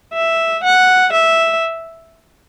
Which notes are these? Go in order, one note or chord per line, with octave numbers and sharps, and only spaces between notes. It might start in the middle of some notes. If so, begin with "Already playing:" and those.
E5
F#5
E5